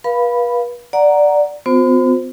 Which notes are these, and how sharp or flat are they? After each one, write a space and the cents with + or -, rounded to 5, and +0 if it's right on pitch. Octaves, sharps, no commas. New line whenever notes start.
B4 -40 F5 +0 B5 +0
D5 +0 F#5 +0 A#5 +0
B3 +45 F4 +40 C5 +0